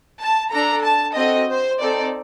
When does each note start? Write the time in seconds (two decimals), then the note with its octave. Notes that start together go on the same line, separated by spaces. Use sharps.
0.20 A5
0.52 D4 A4 A#5
0.84 A5
1.15 C4 F#4 A4 D#5
1.48 C5
1.80 C4 D#4 A4 D5